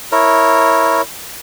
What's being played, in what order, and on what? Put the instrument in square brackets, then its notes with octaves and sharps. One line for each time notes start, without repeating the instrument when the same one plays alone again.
[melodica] E4 A#4 C#5